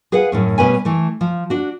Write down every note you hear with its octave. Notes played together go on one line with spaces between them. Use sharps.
G#4 B4 F5 F#5
F#2 A2 C#4
B2 G3 B3 C#4 B4 G#5
E3 A3
F3
D4 F#4